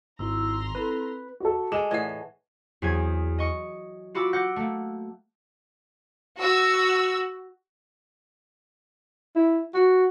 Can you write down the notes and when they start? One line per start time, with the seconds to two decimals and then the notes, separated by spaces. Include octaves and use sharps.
0.19 G#1 E4 A#5 C6 E6
0.75 C4 E4 A4 B4
1.40 F#4 A4
1.72 G#3 G#4 A4 E7
1.91 A2 E3 D5 D#5 F#5
2.82 E2 F#3 C4 G#4 G#6
3.39 D#5 C#6
4.15 F4 F#4 B5 D6 E6
4.33 F#5 D6 G6 A#6
4.56 A3 A#3
6.39 F#4 E6
9.36 E4
9.74 F#4